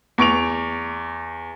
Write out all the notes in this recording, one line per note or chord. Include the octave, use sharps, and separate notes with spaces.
E2 C#6 D7 F7